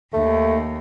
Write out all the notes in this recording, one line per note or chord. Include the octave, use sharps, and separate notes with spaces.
D#2 A3